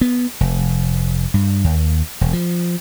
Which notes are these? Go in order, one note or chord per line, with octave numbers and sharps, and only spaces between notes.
B3
F1
G2
D#2
E1
F3